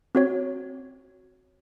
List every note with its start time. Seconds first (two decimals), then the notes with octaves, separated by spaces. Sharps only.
0.15 C4 F#4 C#5